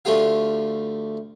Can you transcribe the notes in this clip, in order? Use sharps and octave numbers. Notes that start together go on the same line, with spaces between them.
D2 A3 F4 G4 F5